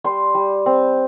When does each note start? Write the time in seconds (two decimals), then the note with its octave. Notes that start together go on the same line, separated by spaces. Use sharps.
0.04 G3 C6
0.34 G3
0.66 C4